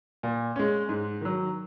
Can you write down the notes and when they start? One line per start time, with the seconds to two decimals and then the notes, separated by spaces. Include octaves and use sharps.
0.23 A#2
0.56 G#3 C#4
0.89 G#2
1.21 D#3 F#3